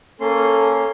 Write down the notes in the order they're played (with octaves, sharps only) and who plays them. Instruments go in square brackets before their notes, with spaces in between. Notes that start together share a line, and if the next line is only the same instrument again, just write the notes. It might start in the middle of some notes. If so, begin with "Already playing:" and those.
[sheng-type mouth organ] A#3 C#4 C6 [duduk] A4